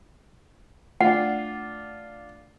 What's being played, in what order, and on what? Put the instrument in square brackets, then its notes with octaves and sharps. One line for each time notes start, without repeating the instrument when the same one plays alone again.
[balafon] A3 [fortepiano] D4 F4 [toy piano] F#5